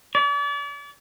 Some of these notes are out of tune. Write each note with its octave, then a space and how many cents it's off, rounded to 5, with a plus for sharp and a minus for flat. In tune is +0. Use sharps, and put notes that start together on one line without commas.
D5 -40